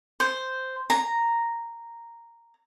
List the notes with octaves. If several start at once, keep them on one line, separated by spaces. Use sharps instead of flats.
C5
A#5